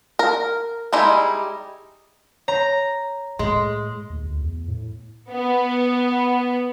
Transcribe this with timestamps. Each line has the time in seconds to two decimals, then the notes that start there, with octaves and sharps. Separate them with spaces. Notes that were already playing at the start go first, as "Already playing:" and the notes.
0.19 A#4
0.93 G3 G#3 D#4 E4
2.48 C#5 A#5
3.39 A2 G#3 C6
4.10 D#2
4.23 D2
4.42 E2
4.68 A2
5.30 B3